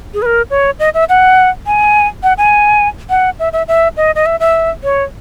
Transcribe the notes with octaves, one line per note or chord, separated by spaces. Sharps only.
G#4
B4
A#4
C#5
D#5
E5
F#5
G#5
F#5
G#5
F#5
E5
E5
E5
D#5
D#5
E5
E5
C#5